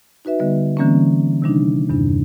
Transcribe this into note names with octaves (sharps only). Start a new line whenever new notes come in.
D#4 F#4 B4 E5
D3 G3 B3 B4 D#5
D3 E3 G3 A#3 C4 C#4
C3 D#3 G3 D4 D#4
E2 G2 C3 D4